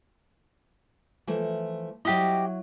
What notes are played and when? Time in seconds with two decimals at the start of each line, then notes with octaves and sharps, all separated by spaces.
1.27 E3 F3 A3
2.05 F#3 E4 G4 D#5